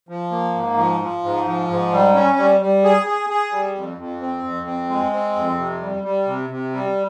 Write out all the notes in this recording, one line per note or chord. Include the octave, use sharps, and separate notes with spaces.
F3
A#3
G#2
F3
F3
G#2
F3
G#2
G3
C#4
G3
G3
G#4
G#4
G#4
G3
F2
F2
C4
F2
C4
G#3
C4
F2
C3
G3
G3
C3
C3
G3